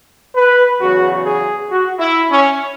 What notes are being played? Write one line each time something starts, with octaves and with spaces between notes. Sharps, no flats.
B4
E2 C#3 F#3 F#4
G#4
F#4
E4
C#4